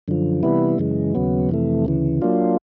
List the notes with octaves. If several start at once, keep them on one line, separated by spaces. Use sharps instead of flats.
F#2 D3 F3
C3 E3 G3 B3 E4
F#2 C#3 E3 G#3
D#2 C#3 F#3 B3
F2 C3 E3 A3
D2 C#3 E3
F#3 A#3 D4 F4